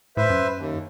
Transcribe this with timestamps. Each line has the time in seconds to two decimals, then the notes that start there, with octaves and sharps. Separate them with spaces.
0.17 A2 B4 C5 E5
0.30 F#2
0.57 D#2